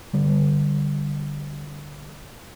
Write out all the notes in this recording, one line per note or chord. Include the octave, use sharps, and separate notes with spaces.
D3 G3